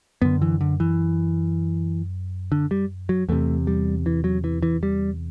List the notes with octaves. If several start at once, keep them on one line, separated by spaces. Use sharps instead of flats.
F#2 D3 B3
E3
D3
E3
D3
G3
F#3
E2 C3 A3
G3
E3
F#3
E3
E3
G3